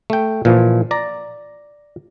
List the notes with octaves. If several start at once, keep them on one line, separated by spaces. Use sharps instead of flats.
A3 G5
A#2 E3 F3
D5 A#5